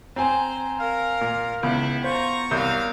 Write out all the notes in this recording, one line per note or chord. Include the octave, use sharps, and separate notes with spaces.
C4 C5 G#5 A#5
A#4 F5
A#2
C#2 B3 E4
F4 C5 A#5 C#6
C2 F#3 A#4 F5 G6